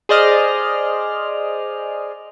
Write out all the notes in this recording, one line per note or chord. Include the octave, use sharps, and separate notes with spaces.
G#4 C5 D5 D#5 F6